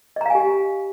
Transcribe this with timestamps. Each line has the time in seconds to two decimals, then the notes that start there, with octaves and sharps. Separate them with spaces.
0.16 D#5
0.21 A#5
0.26 F5
0.30 G#5
0.35 G4